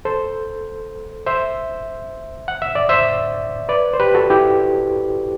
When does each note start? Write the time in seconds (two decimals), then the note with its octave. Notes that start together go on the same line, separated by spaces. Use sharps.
0.05 A4 C5
1.27 C5 E5
2.48 F#5
2.62 E5
2.75 D5
2.89 C5 E5
3.69 B4 D5
3.94 C5
4.00 G4 B4
4.15 F#4 A4
4.30 E4 G4